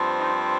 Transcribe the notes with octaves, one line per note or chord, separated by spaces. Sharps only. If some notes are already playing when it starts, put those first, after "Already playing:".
Already playing: G2 F3 C4
D#4